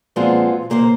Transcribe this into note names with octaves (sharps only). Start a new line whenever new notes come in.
A#2 F3 G#3 B3 C4 F4
C#3 A#3 A#4 C5